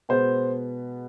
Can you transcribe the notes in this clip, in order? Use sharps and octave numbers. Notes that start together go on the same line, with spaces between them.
B2 G#3 B3 C5